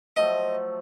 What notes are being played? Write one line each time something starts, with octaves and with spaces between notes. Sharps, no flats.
F3 F#3 A3 D#5